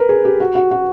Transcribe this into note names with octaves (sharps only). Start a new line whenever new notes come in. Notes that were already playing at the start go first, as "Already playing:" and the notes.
Already playing: A#4 B4
G#4
G4
F#4
F#4
F#4